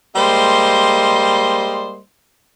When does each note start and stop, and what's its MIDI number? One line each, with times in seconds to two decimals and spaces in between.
0.16 2.01 55
0.16 2.01 56
0.16 2.01 58
0.16 2.01 72
0.16 2.01 75
0.16 2.01 84